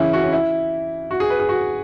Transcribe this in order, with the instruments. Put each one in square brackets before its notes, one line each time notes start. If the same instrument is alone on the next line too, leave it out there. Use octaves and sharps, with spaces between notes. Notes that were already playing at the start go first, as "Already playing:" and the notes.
Already playing: [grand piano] C#3 E3 C#4 E4
F#4
C#4
E4
F#4
G#4
B4
G#4
F#4